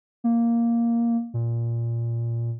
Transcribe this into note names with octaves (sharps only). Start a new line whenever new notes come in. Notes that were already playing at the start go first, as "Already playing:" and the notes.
A#3
A#2